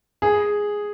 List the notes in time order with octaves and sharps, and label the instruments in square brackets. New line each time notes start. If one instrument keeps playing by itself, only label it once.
[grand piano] G#4